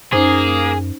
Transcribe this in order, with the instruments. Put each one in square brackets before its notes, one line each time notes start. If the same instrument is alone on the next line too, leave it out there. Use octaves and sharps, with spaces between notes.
[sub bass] F#2 [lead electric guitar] A#3 [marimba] C#4 D#4 C5 [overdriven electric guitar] G#4